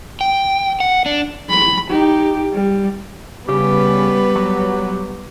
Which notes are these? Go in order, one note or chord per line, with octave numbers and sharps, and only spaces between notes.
G5
F#5
D4
B5
D#4 G4
G3
C#3 G3 B3 G4 B4
F#3